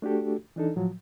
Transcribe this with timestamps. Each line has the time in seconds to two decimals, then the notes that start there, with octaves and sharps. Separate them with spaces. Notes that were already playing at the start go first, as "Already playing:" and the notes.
0.02 A3 D4 F#4 G4 A4
0.56 E3 D4 D#4 A4
0.76 A2 F3 F#3